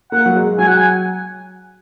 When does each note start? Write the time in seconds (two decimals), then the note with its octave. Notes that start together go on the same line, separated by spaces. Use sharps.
0.12 A#3 F#5
0.26 F#3
0.35 G#3
0.58 F#3 G#5
0.67 F#5
0.77 G#5